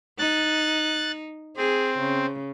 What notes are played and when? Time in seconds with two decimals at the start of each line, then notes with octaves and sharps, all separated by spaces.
0.19 D#4 F#6 A6
1.57 C4 G#4
1.98 C#3